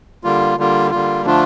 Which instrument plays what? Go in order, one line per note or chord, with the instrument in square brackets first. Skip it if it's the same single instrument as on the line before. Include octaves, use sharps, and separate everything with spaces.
[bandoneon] D3 G3 A#3 F4
D3 G3 A#3 F4
D3 G3 A#3 F4
D3 F3 A3 D4 F4